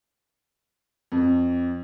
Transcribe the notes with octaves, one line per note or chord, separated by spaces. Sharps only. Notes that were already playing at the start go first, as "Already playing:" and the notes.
F2